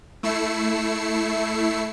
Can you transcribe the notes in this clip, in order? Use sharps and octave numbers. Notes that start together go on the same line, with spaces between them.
A3 E4 E6 C7 C#7